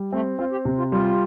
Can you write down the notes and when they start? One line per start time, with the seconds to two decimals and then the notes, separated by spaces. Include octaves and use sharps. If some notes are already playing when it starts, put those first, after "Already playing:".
Already playing: G3
0.13 A3 C4
0.39 C4 F4
0.52 G4
0.65 C3
0.78 F4
0.92 G3 F4